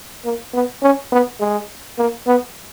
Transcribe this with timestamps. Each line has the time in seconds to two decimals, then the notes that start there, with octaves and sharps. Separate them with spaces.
0.25 A#3
0.54 B3
0.82 C#4
1.12 B3
1.40 G#3
1.98 A#3
2.27 B3